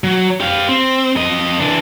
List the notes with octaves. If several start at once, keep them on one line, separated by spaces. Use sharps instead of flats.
F#3
G4 F5
C4
F2 D#5
E3 D4